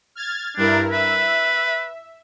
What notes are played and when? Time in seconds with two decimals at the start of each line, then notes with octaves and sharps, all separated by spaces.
0.15 F6 G#6 A6
0.57 G2 D4 E4 A#4
0.92 B4 E5